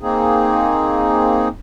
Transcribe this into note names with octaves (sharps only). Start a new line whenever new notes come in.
A#3 C4 D#4 G#4